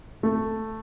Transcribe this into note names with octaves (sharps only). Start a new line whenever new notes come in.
A3